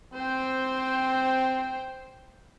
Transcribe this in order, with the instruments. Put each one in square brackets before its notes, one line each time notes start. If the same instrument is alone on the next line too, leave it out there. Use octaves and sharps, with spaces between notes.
[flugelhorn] C4 [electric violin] C5 G5